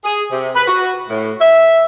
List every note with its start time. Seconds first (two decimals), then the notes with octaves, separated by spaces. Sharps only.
0.03 G#4
0.31 C3
0.55 B4
0.67 F#4
1.08 A2
1.40 E5